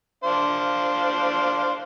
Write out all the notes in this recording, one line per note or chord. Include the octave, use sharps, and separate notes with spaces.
D4 C5 F5